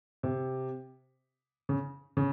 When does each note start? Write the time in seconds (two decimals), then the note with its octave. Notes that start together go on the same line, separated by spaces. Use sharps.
0.23 C3
1.69 C#3
2.17 C#3